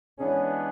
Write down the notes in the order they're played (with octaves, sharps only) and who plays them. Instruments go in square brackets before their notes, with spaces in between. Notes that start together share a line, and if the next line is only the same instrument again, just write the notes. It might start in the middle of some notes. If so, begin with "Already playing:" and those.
[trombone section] E3 G#3 B3 D4 G#4 [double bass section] C#4